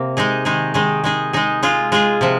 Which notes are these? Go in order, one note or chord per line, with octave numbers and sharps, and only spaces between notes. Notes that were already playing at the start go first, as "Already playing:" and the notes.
Already playing: C3 A#3
G#3 D#4 G#4
D#3 G#3 D#4 G#4
D#3 G#3 D#4 G#4
G#3 D#4 G#4
G#3 D#4 G#4
G#3 F4 G#4
G#3 F4 G#4
C3 F3